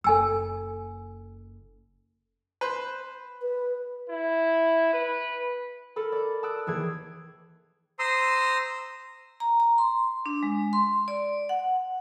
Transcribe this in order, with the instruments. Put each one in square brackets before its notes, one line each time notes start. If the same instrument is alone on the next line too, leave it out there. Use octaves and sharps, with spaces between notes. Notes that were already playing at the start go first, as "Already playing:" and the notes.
[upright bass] F#1 [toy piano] A4 G#5 E6
[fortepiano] B4 C5
[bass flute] B4
[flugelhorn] E4
B4
[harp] A4 A#4 B5
D5
A5 D#6 E6 F#6 D7
D#2 E3 G#4 G#6
[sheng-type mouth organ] C5 A#5 C6 D#6 E6
[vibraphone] A#5
A#5
C6
D4
G#3
C6
D5
F#5